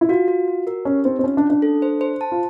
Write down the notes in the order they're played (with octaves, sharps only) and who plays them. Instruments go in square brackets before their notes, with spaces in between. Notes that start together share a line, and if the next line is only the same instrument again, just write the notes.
[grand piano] E4
[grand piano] F4 [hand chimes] F#4
[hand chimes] F#4
F#4
A#4
[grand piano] C#4 [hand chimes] G4
[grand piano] C4 [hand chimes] D#4
[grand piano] C4
[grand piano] C#4 [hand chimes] F4
[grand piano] D4
[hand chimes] C#4
[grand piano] D4
[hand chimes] A4
C5
C5
A5
[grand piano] F4